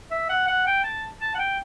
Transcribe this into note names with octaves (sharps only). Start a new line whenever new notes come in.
E5
F#5
F#5
G5
A5
A5
F#5
G5